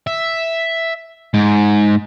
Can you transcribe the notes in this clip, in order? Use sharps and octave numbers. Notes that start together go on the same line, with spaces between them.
E5
G#2